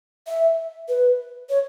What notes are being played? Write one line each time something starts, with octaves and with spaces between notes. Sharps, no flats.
E5
B4
C#5